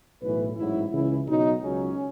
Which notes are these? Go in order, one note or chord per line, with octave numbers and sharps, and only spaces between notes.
B1 A2 E3 B4
A1 G#2 F#3 E4
C#2 C#3 E3 E4
B1 B2 F#3 D#4
C#2 C#3 F#3 C#4